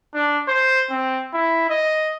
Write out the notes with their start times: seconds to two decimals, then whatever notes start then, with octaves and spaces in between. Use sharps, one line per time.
0.14 D4
0.48 C5
0.91 C4
1.34 E4
1.70 D#5